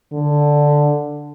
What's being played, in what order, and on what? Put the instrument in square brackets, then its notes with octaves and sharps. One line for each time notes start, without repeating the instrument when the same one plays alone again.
[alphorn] D3